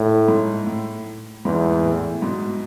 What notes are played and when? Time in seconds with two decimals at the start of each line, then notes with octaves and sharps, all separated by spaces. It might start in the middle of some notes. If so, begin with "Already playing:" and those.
Already playing: A2
0.28 G#2
0.67 A2
1.45 E2 G#2
1.83 A2
2.22 G#2 B2